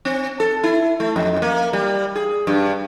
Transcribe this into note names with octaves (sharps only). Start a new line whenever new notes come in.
C4
A4
E4
A3
F2
A#3
G3
G#4
G2